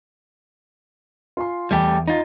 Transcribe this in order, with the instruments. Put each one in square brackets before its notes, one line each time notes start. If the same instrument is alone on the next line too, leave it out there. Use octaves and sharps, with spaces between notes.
[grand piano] F4 G#5 C6
[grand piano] E2 [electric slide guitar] G3 A3 G4
[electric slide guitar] D#4 F4